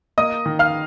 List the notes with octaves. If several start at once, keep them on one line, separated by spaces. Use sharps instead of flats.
A#3 D#5 D#6
D#3
F5 F6